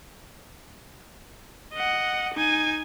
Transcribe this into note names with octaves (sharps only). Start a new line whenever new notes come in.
D#5 F#5
D#4 G#5